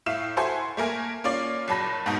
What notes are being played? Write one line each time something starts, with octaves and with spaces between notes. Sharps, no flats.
A2 E5 F5 E7
E4 F#4 A4 C5 G#5 C6
A3 A#3 A#4 G#5
A#3 C#4 F4 D5
F#1 F#3 A5 B5 A#6
G#2 B2 D#4